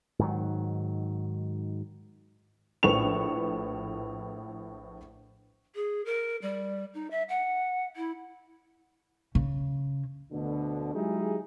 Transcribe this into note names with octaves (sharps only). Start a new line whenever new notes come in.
G#2 D#3 F#3
A#1 A2 B4 C#6 F7
G#4
A#4
G3
D#4
E5
F#5
E4
C#3
D2 B2 D3
F#3 G#3 D#4 E4 G4 G#4